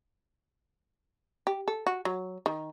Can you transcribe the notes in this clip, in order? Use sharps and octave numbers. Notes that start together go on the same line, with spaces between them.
G4
A4
F#4
F#3
D#3